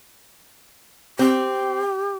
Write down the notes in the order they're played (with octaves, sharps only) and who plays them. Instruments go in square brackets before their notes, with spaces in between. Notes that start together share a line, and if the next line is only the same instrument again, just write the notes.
[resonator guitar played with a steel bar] C4 [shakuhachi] G4